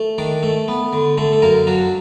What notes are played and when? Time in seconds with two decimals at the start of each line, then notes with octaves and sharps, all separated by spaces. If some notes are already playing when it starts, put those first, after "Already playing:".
Already playing: A3
0.18 D#3 D4 D5
0.43 A3 A4
0.68 B3
0.93 D3
1.18 D3 A3 A4
1.33 A4
1.42 F#2 A#3 A#4
1.67 F#3 D4 F#4